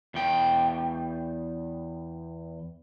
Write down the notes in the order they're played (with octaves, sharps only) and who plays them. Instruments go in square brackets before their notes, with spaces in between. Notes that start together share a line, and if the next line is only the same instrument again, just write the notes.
[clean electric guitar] E2 G5